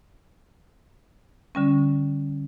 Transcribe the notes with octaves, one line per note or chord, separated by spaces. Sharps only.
D3 G3 C#4